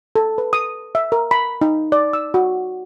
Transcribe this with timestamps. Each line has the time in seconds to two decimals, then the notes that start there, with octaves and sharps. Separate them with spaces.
0.16 A4
0.38 B4
0.53 D#6
0.95 E5
1.12 A#4
1.31 B5
1.61 D#4
1.92 D5
2.13 E6
2.34 F#4